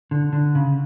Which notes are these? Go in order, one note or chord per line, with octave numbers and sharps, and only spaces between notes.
D3
D3
C#3